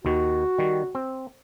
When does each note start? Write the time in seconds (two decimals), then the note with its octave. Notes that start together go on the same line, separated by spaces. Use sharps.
0.05 D#2 D#3 F#4
0.58 D#3 G3
0.95 C4